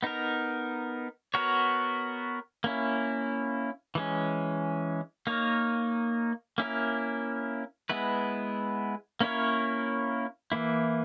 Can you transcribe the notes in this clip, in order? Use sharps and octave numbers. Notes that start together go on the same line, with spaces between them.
B3 D#4 A#4
B3 F#4 A#4 C#5
A#3 C#4 E4
E3 G#3 C#4
A#3 D#4 A#4 C#5
A#3 C#4 E4 A#4
G#3 B3 E4 B4
A#3 C#4 E4 A#4 C#5
E3 A#3 E4